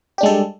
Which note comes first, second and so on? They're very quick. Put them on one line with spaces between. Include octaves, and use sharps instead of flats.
G4 D4 G#3 A4 G3